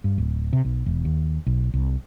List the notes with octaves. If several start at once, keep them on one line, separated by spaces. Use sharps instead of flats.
G2
D1
C3
B1
E1
D#2
B1
C2